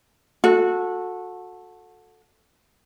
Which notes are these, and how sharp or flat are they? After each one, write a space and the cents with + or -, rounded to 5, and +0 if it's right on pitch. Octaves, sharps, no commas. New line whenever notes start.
F#4 -25 A4 +0